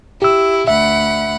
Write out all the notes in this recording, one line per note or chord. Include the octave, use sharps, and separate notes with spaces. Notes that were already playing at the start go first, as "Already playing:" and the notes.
E4 G4 E6
D2 E5 F#5 B5